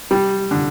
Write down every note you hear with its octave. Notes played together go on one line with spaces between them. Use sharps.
G3
D3